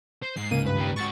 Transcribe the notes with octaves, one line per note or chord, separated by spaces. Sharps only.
C5
G#2 C7
C#2 A#3 D#7
G2 B4
D#3 G4
G#2 F#4 C#6 A6